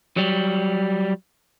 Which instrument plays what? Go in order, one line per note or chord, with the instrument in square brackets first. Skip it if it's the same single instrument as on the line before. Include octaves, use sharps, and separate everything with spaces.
[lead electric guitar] F#3 G3